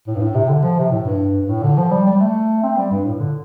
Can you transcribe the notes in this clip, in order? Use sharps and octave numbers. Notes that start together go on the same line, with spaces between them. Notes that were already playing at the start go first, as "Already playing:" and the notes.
A2
G2
A2
C3
D3
F3
C3
A2
G2
G2
A2
D3
F3
G3
G3
A3
C4
G3
G2
A2
D3